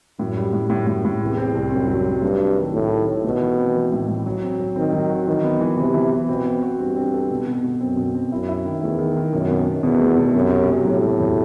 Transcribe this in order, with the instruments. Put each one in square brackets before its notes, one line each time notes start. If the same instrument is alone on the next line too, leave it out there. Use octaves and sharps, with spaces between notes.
[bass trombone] F#2 [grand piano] A2
[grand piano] G3
A2
[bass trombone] F#2 [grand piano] A2
[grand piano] A2
A2
[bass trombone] E2 [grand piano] C3
[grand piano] C4
C2
[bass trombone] F#2 [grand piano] C4
[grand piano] F#3
F#3
[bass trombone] G2 [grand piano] A3
[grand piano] C3
D#3
[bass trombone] A2 [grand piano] D#3
[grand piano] D#3
D#3
[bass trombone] B2 [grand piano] A3
[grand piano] E3
C4
E3
A2
A2
F#3
C4
F#3
[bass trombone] D#3 [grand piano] C4
[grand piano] F#3
F#4
[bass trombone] D#3 [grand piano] E3
[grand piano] B3
E3
[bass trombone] C3 [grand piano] E3
[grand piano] E3
B3
[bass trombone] B2 [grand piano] C4
[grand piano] C4
F#4
[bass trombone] G2 [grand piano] C4
[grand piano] C4
A4
B2
B2
B2
[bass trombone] F#2 [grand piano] C4
[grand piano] B2
C4
[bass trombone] F#2 [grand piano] E4
[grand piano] E4
D#3
[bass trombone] E2 [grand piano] A3
[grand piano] D#3
D#3
[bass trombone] F#2 [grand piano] B2
[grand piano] B2
B2
[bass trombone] E2 [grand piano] B2
[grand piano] A3
B2
[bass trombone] F#2 [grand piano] C3
[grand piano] C3
F#3
[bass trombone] A2 [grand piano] F#3
[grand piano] F#3
E2